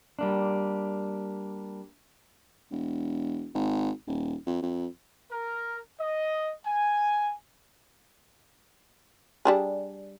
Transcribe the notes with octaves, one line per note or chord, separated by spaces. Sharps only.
G3 A#3 D4
E1
G#1
D#1
F2
F2
A#4
D#5
G#5
G3 D4 G#4